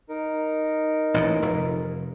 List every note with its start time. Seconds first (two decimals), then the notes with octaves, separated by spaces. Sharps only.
0.09 D#4 A#4
1.14 A1 A#2
1.42 F1